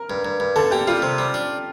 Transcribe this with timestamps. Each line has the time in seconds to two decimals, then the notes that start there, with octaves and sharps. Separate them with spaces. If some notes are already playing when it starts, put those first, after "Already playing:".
Already playing: A#4
0.10 G2
0.25 G2
0.40 G2
0.56 D3 A4
0.71 A#3 G4
0.87 G3 F4
1.02 C3
1.18 G3
1.34 D4